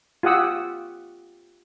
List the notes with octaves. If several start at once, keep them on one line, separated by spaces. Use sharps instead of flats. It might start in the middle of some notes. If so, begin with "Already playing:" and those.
F4 G4 F#5 D#6 E6